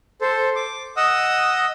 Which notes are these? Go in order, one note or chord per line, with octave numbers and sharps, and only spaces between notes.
A4 C5
D6
D#5 F#5 D#6 E6